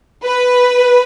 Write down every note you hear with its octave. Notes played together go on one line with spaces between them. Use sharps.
B4